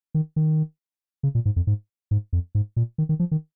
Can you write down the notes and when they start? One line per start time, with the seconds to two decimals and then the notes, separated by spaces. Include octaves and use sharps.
0.14 D#3
0.36 D#3
1.23 C#3
1.35 A#2
1.45 G#2
1.56 F2
1.67 G#2
2.11 G#2
2.33 F2
2.55 G#2
2.76 A#2
2.98 D#3
3.09 D#3
3.19 F3
3.31 D#3